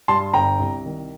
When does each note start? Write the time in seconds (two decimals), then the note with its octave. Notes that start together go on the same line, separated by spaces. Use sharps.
0.08 G2 A5 C6
0.34 G1 G5 A#5
0.60 C2
0.86 D#3